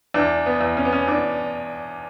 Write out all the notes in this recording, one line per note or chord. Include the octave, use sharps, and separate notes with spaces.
E2 D4
B3
E2
C#4
B3
C#4
E2 D4